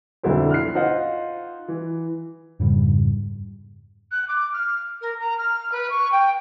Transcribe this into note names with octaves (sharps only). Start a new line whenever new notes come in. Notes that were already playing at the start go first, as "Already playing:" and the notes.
B1 F2 D3 E4 C5
F6 F#6 C7
D#4 F4 C5 F#5
E3
F2 G#2 C#3 G3
F#6
D6
F6
A#4
A#5
F6
B4
C#6
G5